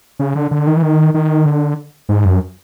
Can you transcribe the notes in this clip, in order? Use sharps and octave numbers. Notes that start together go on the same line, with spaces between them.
C#3
D3
D3
D#3
E3
D#3
D#3
D3
G#2
F#2